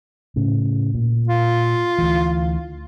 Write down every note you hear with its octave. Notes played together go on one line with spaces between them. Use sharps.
A2 C#3
A#2
F4
D2 E3